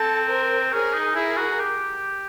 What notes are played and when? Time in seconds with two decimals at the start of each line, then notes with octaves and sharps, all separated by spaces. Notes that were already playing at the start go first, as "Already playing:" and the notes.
Already playing: C4 A4
0.29 A#4 C5
0.73 C#4 G#4 A#4
0.94 D#4
1.16 E4 G#4 A#4
1.37 F#4
1.59 G4